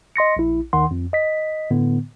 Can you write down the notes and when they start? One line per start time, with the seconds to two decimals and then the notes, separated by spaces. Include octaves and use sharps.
0.16 D#5 C6 A#6 C#7
0.37 A#1 E4
0.73 D#2 D#3 F#5 C6
0.91 F2
1.13 D#5 B6
1.71 A2 D3 B3